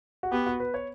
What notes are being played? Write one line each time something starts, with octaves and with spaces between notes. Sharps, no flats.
F#4
B3 G4
F#4
B4
C#5